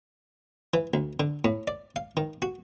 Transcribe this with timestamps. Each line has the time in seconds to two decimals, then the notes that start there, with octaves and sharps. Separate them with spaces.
0.74 E3
0.94 D2
1.20 D3
1.45 A2
1.68 D5
1.96 F5
2.17 D#3
2.42 F#4